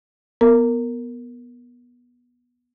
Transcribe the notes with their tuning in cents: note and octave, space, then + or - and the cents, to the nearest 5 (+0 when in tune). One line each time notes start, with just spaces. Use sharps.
B3 -15 A#4 -15